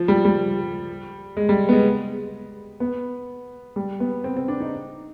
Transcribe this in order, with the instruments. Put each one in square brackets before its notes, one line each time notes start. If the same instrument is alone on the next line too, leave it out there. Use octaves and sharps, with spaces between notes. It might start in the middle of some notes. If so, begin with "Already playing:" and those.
Already playing: [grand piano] F3
G3
G3
G#3
G3
B3
G#3
B3
G3
B3
C4
C4
D4
D#4